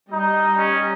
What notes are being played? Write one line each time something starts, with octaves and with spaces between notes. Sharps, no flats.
G3 D#4 D#5
C#4